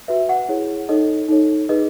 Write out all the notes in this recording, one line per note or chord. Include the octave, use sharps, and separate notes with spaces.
F#4 B4 E5
F#5
E4 G#4 C#5
D#4 A4 C#5 D#5
D#4 A4 C#5
D#4 G#4 B4 D#5